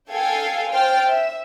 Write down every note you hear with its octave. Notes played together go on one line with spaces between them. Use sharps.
A4 F5 G5 G#5 G#6
C5 G5 F6 A6
E5